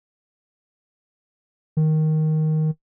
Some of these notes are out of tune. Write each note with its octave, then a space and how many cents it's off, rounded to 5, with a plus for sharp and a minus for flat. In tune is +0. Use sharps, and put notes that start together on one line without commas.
D#3 +5